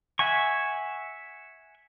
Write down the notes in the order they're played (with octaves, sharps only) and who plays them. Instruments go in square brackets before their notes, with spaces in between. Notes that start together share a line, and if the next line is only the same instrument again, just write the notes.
[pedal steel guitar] E5 F#5 G#5 C#6